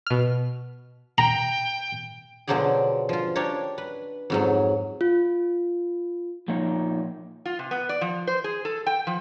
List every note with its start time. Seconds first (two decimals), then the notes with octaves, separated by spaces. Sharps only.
0.06 B2 F6
1.18 G5 A#5
2.47 B2 D3 F3 F#3 G4 G#4
3.09 F3 F4
3.36 D4 G4 A#4 C#5
3.78 B4
4.30 F2 G#2 F#3
5.01 F4
6.48 A#2 F3 A#3 D#4 C#5
7.46 F4
7.59 C3
7.71 B3
7.89 D5
8.01 F3
8.27 C5
8.44 G#4
8.65 A4
8.87 G5
9.07 F3